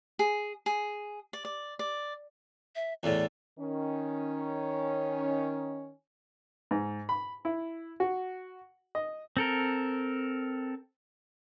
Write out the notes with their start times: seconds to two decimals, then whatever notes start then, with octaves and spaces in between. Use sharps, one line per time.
0.19 G#4
0.66 G#4
1.33 D5
1.45 D5
1.79 D5
2.75 E5
3.03 E2 A2 D5
3.57 D#3 C#4
6.71 G#2
7.09 B5
7.45 E4
8.00 F#4
8.95 D#5
9.37 C4 A4 A#4